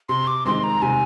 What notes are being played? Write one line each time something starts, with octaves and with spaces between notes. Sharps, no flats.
C3 C6
D6
D#3 G#3 C4 C6
A#5
C3 G#5